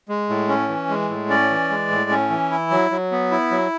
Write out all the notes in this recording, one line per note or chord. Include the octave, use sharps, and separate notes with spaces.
G#3
A2
C#4
E3
G#3
A2
C#4 D5
E3
G#3
A2
C#4
E3
E4
F#3
F#3
B3
E4
F#3